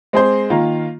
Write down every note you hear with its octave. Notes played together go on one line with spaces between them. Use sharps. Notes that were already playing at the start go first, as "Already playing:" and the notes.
G#3 C4 G#4 C5
D#3 A#3 F4